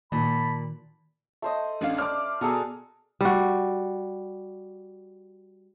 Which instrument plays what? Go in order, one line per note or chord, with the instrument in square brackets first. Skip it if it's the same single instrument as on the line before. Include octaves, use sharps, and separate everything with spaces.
[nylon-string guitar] A#2 [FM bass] D#3 [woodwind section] A5 B5
[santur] A3 C5 D#5
[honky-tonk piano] A1 D4 F5
[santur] C5 D5 [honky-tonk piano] D6 F6
[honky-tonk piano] B2 [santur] G#4 A4 A#5
[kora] G3 F#4